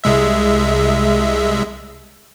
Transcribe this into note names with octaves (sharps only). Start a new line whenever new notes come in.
C2 G#3 E5